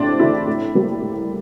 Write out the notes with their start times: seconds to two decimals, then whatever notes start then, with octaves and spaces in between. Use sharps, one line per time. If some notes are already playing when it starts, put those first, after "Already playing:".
Already playing: A2 C4 D4
0.19 E3 A3 E4
0.48 A2
0.75 G3 A#3
1.02 A2